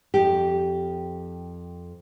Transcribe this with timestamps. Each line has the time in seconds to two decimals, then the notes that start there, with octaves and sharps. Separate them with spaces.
0.14 F2 G4